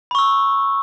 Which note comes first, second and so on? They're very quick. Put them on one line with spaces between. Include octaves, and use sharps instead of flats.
B5 C#6 E6